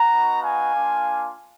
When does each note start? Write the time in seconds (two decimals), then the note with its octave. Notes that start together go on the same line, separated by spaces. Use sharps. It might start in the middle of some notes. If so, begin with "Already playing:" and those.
Already playing: F#5 A#5
0.13 B3 D#4 F#4
0.43 F5 G#5
0.74 A#3 D4 F4